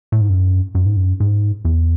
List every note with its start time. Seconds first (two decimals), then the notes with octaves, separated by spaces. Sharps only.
0.12 A2
0.21 G#2
0.30 F#2
0.75 F#2
0.86 G#2
0.97 F#2
1.20 G#2
1.65 E2